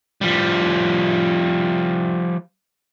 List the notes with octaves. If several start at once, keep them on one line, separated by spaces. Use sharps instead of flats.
F3 G3